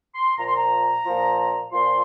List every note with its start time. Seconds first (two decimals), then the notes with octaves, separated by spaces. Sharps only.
0.15 C6
0.37 A#2 F3 A#5
0.47 C6
0.56 A#5
1.04 A#2 F3
1.72 A#2 F3 C6